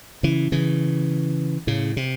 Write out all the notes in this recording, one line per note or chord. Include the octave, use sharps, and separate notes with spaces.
C#3 E3
C#3 E3
A2 C#3
C3